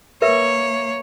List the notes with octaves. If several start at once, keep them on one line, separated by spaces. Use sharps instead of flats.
A#3 A#4 B4 C#5 E5